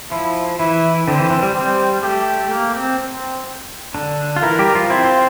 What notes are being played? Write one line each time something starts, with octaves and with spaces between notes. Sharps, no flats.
F3 E4
E3 E4
D3 C4
E3
E3
G3
G3 C4
A3 G4
A#3
C4
C4
D3 D4
F4
E3 E4 A#4
G3 G4
F3 F4
C4 E4
F4